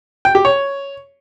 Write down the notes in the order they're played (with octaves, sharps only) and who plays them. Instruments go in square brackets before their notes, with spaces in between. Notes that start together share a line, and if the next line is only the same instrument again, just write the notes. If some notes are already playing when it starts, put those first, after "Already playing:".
[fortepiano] G5
G4
C#5